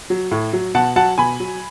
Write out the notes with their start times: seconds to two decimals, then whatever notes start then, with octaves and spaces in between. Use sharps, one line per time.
0.10 F#3
0.31 A2
0.53 F#3
0.75 B2 F#5 A5
0.96 F#3 F#5 A5
1.18 B2 G#5 B5
1.40 F#3